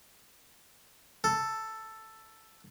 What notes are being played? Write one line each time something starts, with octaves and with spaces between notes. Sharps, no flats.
A4